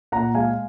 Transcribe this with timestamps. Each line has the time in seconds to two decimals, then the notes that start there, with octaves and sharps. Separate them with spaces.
0.12 A#2 F#5 A#5
0.35 G#3 F5 G#5